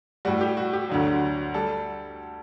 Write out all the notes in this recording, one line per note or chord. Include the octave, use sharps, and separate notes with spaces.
A2 G3 F#4
G4
F#4
G4
D2 D3 F#3
G3 A4